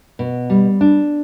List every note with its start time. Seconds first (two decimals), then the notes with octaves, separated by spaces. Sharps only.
0.19 B2
0.50 G3
0.81 D4